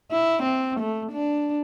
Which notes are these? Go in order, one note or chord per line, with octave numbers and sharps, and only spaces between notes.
E4
C4
A3
D4